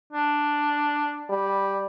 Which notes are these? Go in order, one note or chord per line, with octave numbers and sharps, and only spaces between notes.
D4
G3